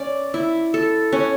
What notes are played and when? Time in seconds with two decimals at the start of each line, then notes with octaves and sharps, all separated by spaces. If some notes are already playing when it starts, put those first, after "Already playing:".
Already playing: C#4 D5
0.34 E4
0.74 A4
1.12 C#4